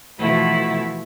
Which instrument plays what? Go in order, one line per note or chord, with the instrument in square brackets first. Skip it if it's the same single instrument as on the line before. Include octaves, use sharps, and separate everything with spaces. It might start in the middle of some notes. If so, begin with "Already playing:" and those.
[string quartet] B2 E3 F3 A3 E4 F#4